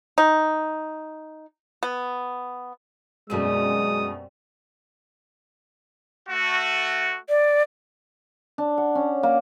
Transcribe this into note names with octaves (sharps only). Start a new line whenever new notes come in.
D#4
B3
F#2 B2 G3 G#3 C4 D#6 D#7
A3 F#4
D5
D4
F#5
C#4
A#3